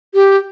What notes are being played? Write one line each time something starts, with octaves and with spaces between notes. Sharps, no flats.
G4